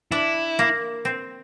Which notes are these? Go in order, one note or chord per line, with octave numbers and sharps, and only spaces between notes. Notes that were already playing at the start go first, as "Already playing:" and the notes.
D4 E4
A#3
C4